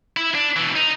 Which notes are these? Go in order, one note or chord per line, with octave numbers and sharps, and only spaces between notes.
E4
D4
B2 E3
D#4